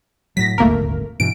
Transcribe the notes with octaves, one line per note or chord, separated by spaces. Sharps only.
A2 F#3 A#6 B6
D#1 G#1 D2 A3 A#3 A#4
G2 B2 E3 D7